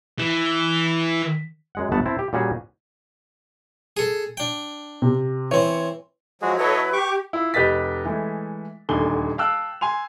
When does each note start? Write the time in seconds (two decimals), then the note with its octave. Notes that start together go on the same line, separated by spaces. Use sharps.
0.19 E3
1.75 F#2 G#3 F#5
1.92 G1 A3 B3 F#5 A5
2.06 C4 E4 A5
2.19 G4
2.33 A#2 G3 C#4 F#4 G#4
3.97 G#4 A4
4.37 D4 G5
5.02 C3
5.51 E3 C4 C#5
6.42 F3 F#3 G#3 F#4 G#4
6.58 F#3 E4 A4 B4 C#5 D#5
6.93 G4 C#6 D6
7.33 E4 F4
7.54 F1 G4 B4 D#5 A6 B6
8.05 E3 G#3 A3
8.89 D#1 D2 D3 D#3 G#5 G7
9.38 F5 G5 A5 E6 F#6
9.81 G#5 C6 F7